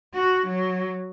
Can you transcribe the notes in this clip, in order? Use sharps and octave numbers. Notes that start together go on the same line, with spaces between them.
F#4
F#3